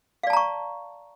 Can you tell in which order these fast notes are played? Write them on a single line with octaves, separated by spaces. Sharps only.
F5 D5 A5 A#5 C#6